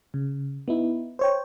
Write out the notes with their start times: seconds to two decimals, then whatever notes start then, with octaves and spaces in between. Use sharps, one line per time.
0.14 C#3
0.68 B3 D#4 E4
1.19 C5 C#5 G5